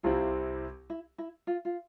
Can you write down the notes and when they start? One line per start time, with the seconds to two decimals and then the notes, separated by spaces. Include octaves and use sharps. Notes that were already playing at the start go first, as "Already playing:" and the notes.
0.03 C2 C3 G3 C4 E4 F4
0.90 E4
1.18 E4
1.47 F4
1.65 F4